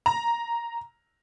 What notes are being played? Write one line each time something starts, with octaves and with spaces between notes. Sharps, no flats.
A#5